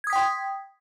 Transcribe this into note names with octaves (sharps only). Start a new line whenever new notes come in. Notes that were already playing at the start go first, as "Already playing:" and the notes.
G5 C6 D#6 G#6 B6